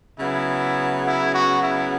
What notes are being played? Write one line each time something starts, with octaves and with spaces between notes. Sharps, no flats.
C#3 F#3 B3 E4
E4
F#4
E4